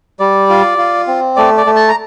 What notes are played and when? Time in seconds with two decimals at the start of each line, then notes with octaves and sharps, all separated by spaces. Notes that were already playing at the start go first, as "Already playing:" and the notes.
0.19 G3 D5
0.50 F4
0.78 F4
1.07 C4
1.36 A3 D5
1.57 D5
1.66 A3
1.76 A5
1.89 A#5